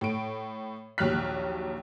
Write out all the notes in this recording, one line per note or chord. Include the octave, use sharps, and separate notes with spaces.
A2 D7
A#1 D#2 F#3 F6 F#6 B6